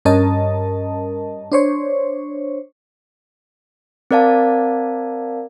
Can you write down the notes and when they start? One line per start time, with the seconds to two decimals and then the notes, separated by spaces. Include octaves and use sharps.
0.05 G2 C#4 A#4 D#5 A5
1.52 D4 C5 C#5
4.11 C4 A#4 D5 F5 A5